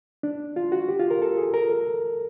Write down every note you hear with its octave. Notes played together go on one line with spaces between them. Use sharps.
D4
F4
F#4
G4
F4
A#4
A4
G#4
A#4
A4